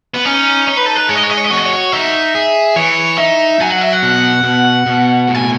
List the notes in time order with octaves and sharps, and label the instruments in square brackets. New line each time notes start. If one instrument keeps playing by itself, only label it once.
[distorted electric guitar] B3
[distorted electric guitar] C#4 [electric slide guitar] D#4
[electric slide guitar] D#4 [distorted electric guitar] C#5
[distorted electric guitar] B4
A4
B4
[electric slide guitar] G#3 [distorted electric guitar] C#5
[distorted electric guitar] D#5
C#5
D#5
C#5
D#5
[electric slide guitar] F#4 [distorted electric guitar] C#5
[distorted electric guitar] D#5
C#5
[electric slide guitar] D#4 [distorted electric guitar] E5
[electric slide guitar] G#4
[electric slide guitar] E3 [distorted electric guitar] C#5
[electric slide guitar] D#4 [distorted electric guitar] E5
[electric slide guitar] F#3 [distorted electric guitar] G#5
[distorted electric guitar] F#5
E5
F#5
[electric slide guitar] B2
B2
B2
A2
[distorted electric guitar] G#5